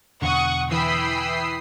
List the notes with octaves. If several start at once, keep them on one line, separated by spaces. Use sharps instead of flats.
E1 E2 D3 F#5 C#6 D#6
E3 G5 B5 D#6 E6 C7